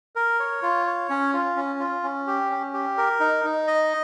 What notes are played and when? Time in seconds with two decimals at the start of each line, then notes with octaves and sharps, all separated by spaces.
0.16 A#4
0.40 C#5
0.62 F4
0.87 C#5
1.10 C#4
1.33 F4
1.56 C#4
1.79 F4
2.03 C#4
2.27 G4
2.50 C#4
2.73 G4
2.98 A#4
3.20 D#4
3.45 D#4
3.67 D#5